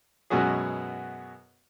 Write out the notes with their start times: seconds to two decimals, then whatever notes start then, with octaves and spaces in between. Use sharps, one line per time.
0.30 F#2 B2 G#3 B3 F#4 G#4